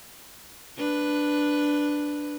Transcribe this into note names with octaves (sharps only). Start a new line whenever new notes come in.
D4 B4